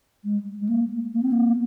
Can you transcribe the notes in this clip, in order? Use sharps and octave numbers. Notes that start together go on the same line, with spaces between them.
G#3
G#3
A#3
A#3
C4
A#3